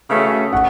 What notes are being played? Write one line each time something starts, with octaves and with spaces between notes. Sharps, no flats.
C#3 E3 A3 C#4 F#4
F#5